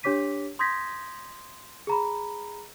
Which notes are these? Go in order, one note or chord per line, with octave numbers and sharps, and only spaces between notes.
D4 G4 C#5 D6 B6 D#7
C6 D#6 G6 G#6 A#6 B6
G#4 A#5 B5